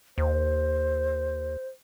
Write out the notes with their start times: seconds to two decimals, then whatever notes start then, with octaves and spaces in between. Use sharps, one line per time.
0.18 D#2 C5